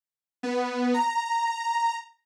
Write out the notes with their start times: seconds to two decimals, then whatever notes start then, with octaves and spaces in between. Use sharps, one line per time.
0.43 B3
0.94 A#5